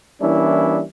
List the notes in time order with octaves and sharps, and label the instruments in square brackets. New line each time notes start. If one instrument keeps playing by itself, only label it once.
[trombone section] E3 G3 A#3 C#4 D4 E4